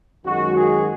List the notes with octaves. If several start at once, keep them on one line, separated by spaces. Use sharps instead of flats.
F#2 D#3 G#3 F#4
G#4